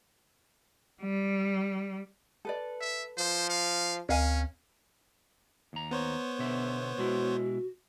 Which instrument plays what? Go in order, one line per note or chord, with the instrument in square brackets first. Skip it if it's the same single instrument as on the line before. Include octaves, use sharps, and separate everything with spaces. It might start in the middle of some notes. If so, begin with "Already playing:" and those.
[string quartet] G3
[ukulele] A4 B4 D5
[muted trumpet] E5
[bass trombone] F3 [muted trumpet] C5
[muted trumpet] F5
[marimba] D2 [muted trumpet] C#4 [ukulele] A#4 F5 G#5
[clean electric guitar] D#2 A#5
[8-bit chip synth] B3 C5 C#5
[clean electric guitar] B2 D3 E5
[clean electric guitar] B2 G#3 E4 [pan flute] F#4